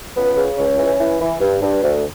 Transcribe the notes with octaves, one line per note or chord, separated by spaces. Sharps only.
C#2 B3
C#3
C#2 C#4
E3
E3
E3
G2
G2
D2